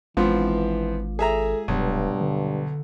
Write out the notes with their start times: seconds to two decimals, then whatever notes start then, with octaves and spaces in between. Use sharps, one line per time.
0.17 G#1 E3 F3 G#3 B3 C4 F4
1.19 G#4 A4 E5 A#5
1.68 D#1 B1 G2
2.20 D3